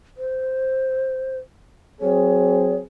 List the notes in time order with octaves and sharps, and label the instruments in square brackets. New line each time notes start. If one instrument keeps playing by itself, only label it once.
[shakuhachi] C5
[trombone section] F#3 C4 G#4 [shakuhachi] C#5